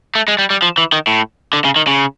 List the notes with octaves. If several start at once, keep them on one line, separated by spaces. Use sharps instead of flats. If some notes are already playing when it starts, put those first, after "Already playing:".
A3
G#3
G3
G3
F3
E3
D#3
A2
D3
C#3
D#3
C#3